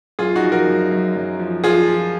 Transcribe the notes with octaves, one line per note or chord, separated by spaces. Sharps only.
F#2 F4 G#4
D#4 F#4
F3
F#4 A#4
F#2
F#2
F#2
F3
F3 F4 G#4
F3